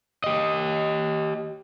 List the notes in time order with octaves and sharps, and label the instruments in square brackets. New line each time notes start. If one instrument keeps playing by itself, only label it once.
[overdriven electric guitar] G4 D#5